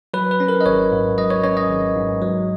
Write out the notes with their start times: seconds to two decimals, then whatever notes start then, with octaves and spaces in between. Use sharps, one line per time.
0.14 F#3 B4
0.31 B4
0.40 C#4
0.48 A#4
0.61 D#5
0.66 G#1 C#5
0.92 G#2
1.18 F#3 D#5
1.30 C#5
1.44 C#4 C#5
1.57 D#5
1.70 G#1
1.96 G#2
2.22 F#3